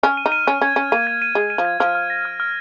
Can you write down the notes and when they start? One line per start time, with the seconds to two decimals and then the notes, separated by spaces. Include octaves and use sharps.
0.03 C#4 F6
0.17 D#7
0.26 D#4
0.32 D#7
0.47 C#4 F6
0.61 C#4 G#6
0.76 C#4 D#7
0.92 A#3 D#7
1.07 G#6
1.22 D#7
1.35 G#3 G#6
1.50 D#7
1.58 F3
1.65 G#6
1.80 F3 F6
1.95 F6
2.10 A#6
2.25 F6
2.40 F6